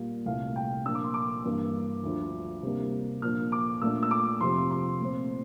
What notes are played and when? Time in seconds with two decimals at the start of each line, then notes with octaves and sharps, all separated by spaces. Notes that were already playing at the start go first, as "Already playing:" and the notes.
Already playing: A#2 G3 A#3
0.26 C2 A#2 A3 F5
0.56 G5
0.85 A#2 F3 A#3 D4 E6
0.95 D6
1.04 C6
1.14 D6
1.44 G2 E3 A#3 D4
2.03 D2 D3 F3
2.63 C3 G3 A#3 D4
3.22 A#2 F3 A#3 D4 F6
3.52 D6
3.81 A#2 A3 D4 E6
4.03 E6
4.11 D6
4.41 F2 C3 F3 C6
4.71 C6
5.00 A#2 A3 C4